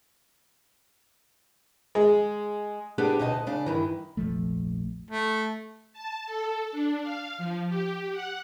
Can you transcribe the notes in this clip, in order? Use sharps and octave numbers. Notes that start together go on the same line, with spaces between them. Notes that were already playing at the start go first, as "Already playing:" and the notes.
G#3
B3 D4 G4 G#4 B4 F#5
D2 B2 D#4 D#5 A5
C#3 D4
G2 D#3 E3
F1 A#1 F3 A3
A3
A5
A4
D4
F5
F3
G4
F#5